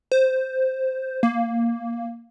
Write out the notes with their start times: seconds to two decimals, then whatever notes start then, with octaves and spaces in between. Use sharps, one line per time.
0.12 C5
1.23 A#3